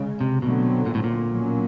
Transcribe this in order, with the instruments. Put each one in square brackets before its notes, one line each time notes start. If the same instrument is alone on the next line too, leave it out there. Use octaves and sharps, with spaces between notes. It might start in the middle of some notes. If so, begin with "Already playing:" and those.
Already playing: [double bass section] C#3 G#3
[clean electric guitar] C3
[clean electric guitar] B2 [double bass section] D3 F#3 A3 C4
[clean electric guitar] A#2
A2
A#2
[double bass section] B2 F#3 A#3 C#4